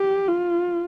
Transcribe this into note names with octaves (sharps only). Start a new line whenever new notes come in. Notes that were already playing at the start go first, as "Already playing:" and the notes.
Already playing: G4
F4